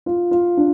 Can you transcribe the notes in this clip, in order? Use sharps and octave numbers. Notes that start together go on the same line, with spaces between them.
F4
F4
D4